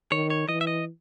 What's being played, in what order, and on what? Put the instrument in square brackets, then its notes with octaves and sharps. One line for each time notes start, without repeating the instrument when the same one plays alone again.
[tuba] D#3 [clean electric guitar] C#5
[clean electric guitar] C#5
[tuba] E3 [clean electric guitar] D#5
[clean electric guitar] E5
D#5